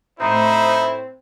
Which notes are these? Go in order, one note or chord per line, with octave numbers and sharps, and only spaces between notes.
A2 A3 C4 D#4 E4 C5 E5